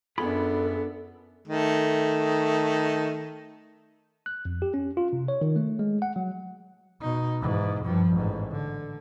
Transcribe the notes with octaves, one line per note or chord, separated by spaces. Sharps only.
F#2 B3 D4 F4 G#4 A4 B5
D#3 A3
F#6
F2
G4
C#4
F4
C3
C#5
D#3
A3
G#3
F#5
F#3
B2 D#4
G#2 E3
G2 F3
A1 G#2
D3